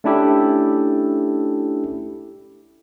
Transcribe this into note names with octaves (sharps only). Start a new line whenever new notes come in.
A3 C#4 D4 E4 G4 A4